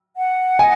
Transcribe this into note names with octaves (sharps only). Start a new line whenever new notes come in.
F#5
D#5 G#5